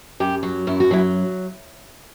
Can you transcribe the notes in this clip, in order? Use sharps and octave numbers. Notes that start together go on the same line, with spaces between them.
F#2 G4
F#3
F#2 E4
F#4
F#3 E4